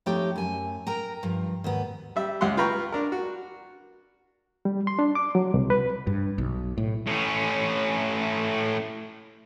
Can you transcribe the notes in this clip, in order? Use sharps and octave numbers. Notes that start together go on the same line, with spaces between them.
F2 A3 D#4 G4 C#5 G5
F#2 G#5
A#4 G5 A#5
G2 F3
D#2 G#2 B3
G3 E5
C#2 G4 F#5 C6
F4 B4 G5 A#5 B5 C#6
D4 A#4
F#4
G3
C6
D4
D6
F#3
C2
B4
G2
B1
A2
A2 C#4